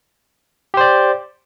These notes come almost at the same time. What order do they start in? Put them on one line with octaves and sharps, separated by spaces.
G4 C5 D5